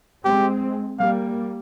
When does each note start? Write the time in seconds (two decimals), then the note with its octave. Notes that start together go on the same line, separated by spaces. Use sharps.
0.25 G#3 C4 G4
0.99 G3 A#3 F5